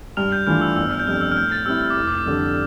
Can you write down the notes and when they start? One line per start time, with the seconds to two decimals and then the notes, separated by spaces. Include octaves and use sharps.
0.17 G2 F6 F7
0.32 G6
0.47 E3 A3 D4 F4 F6
0.61 E6
0.76 G1 E6
0.91 F6
0.99 G6
1.06 F2 C3 G3 D4 F6
1.21 E6
1.32 F6
1.36 A2 G6
1.52 A6
1.66 G3 C4 E4 E6
1.81 E6
1.90 D6
1.96 F1
2.07 D6
2.26 F2 D3 G3 D4